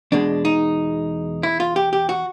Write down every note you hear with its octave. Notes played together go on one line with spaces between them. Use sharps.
E2 B2 G#3 D4
D#4
E4
F4
G4
G4
F#4